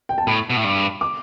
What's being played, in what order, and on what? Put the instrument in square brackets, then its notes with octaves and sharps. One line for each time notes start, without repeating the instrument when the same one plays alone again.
[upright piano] G5
A5
[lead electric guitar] A2 [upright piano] B5
[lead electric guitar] B2
A2
G2
[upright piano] D6